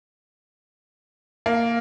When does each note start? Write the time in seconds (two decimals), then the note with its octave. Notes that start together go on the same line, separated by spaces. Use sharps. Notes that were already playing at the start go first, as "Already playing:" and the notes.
1.46 A#3